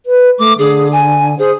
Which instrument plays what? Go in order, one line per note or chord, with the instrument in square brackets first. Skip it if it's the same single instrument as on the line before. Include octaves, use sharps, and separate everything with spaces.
[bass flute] B4
[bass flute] A3 [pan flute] D6
[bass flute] D3 [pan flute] G#4
[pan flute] G#5
[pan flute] G#4 [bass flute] C5